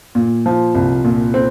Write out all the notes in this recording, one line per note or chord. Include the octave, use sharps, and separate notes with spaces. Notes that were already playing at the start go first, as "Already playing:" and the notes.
A#2
F3
C2
A#2
C4